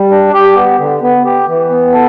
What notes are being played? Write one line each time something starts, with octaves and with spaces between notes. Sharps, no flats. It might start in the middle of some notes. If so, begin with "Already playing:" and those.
Already playing: G3
D4
G4
B3
D3
B3
G4
E3
B3
A4